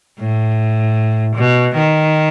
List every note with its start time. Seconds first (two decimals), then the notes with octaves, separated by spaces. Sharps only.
0.19 A2
1.36 B2
1.75 D#3